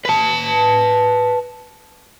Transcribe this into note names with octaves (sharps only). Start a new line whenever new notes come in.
B4 A5